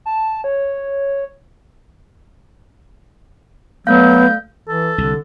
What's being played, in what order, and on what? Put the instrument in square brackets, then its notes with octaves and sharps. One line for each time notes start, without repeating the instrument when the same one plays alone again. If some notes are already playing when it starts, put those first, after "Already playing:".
[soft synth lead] A5
C#5
[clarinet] F#3 [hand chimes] A3 F5 [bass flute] B3 [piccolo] G6
[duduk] E3 [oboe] A4
[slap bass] C2 [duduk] D3